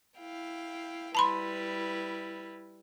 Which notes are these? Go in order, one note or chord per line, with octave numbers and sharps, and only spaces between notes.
E4 F5 G5
G3 E4 B4 A5 B5 C6